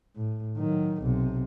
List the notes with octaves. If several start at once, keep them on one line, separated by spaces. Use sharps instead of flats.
A2
D#3 F#3
B1 C3